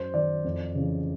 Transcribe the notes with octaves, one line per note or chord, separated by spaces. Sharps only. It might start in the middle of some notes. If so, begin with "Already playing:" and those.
Already playing: F#2 C5
D#3 D5
F2
C#3 E3